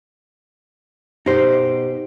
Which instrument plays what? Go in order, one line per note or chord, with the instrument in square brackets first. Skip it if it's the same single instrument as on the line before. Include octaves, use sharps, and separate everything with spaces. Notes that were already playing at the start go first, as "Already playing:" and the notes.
[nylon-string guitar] B2 G4 [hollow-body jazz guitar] D#4 C5